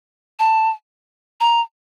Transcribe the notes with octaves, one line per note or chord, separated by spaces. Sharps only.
A5
A#5